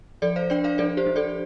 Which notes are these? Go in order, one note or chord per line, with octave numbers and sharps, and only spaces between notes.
F3 A4 D5
C5 F5
D4 D5 G5
C5 F5
F3 A4 D5
G4 C5
F3
A4 D5